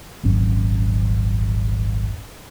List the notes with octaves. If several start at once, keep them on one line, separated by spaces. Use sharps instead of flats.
D#1 G#1 F#2 C#4